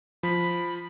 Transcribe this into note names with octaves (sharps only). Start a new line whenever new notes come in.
F3 B5